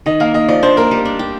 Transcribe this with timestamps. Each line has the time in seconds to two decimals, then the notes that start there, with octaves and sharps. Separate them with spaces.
0.06 D#3 D#5
0.20 A#3 F5
0.34 A#3 D#5
0.48 F3 D5
0.63 D4 C5
0.77 A#3 A#4
0.91 G3
1.05 D4
1.19 G4